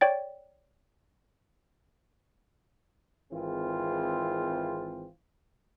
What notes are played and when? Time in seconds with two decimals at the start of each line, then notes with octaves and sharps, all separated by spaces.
0.01 C#5 D5 G5 A6
3.32 G#1 E3 C4 F4 G#4